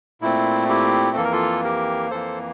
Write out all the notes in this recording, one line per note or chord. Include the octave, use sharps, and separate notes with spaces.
A#2 A3 C4 E4
E4 G4
F2 E3 A#3 A4
A#4
F4 A4
G4 A#4
F2 E3 A#3 A4 C5